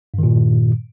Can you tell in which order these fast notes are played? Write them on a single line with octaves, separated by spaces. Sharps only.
G2 D#3 A#2